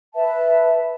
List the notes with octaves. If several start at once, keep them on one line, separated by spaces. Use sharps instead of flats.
B4 E5 A5